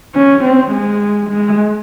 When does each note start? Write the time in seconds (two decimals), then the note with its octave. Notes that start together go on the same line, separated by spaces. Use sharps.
0.16 C#4
0.44 C4
0.72 G#3
1.29 G#3